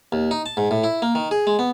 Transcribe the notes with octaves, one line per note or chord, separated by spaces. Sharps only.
D#2
D#4
A5
G#2
A2
E4
A#3
D#3
G#4
G#3
B3